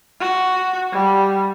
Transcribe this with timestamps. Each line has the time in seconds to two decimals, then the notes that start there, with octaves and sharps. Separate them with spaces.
0.20 F#4
0.92 G3